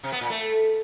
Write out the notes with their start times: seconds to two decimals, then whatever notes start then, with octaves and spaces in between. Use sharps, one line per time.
0.04 C3
0.12 B3
0.21 A#2
0.30 A3